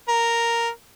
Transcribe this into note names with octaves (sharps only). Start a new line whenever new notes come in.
A#4